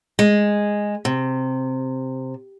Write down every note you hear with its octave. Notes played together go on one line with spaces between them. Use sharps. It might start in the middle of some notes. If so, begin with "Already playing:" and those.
G#3
C3